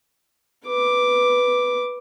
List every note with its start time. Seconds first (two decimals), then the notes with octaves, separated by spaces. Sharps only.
0.66 B4 D6